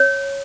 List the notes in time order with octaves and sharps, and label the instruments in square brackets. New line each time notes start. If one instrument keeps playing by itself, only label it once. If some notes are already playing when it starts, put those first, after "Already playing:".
Already playing: [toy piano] C#5